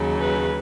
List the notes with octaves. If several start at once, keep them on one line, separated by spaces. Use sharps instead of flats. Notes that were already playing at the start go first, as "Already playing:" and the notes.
Already playing: D#2 C#3 F#3
B4